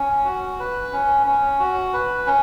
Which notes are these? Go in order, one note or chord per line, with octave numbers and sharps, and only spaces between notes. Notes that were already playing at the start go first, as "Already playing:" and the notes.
Already playing: C#4
F#4
B4
C#4
C#4
F#4
B4
C#4